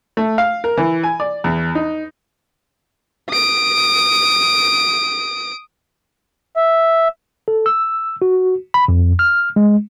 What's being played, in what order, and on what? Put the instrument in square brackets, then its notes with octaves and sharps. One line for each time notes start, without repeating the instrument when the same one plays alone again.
[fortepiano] A3
F5
A#4
E3
G#5
D5
E2
D#4
[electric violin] D#6 D7
[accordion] E5
[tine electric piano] A4
E6
F#4
B5
F2
F6
G#3